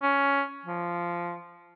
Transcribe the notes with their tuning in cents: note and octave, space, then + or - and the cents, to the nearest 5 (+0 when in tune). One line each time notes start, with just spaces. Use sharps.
C#4 +10
F3 -10